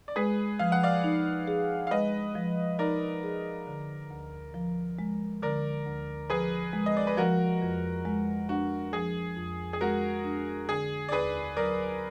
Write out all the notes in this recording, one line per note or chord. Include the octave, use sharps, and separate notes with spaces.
D5
G#3 G#4 B4
F3 F5
F#5
D5 F5
D#4
G#4
F5
G#3 B4 D#5
F3
D#4 A#4 D5
G#4
D3
D2
F3
G#3
D3 A#4 D5
D2
F3 G#4 B4
G#3
D#5
D5
B4
F3 F#4 A#4
F2
G#3
D4 F#4
F3 G#4
F2
G#4
G#3 F#4 A#4
D4
D3 G#4
D5
D#2 G#4 B4
F#3 A#4 D5